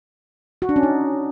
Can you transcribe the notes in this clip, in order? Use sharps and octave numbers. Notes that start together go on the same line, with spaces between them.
F#4
D4
C#4
D#4